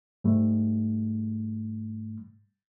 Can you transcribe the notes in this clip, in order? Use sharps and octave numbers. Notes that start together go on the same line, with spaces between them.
G#2 G3 A3